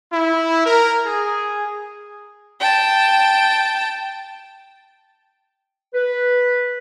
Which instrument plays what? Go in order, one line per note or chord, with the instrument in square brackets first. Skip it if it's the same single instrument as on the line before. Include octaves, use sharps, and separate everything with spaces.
[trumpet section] E4
A#4
G#4
[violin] G5 A5
[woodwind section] B4